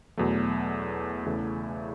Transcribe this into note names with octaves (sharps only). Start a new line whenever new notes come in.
E2 B2 F#3 A3
E2 C#3 E3 A3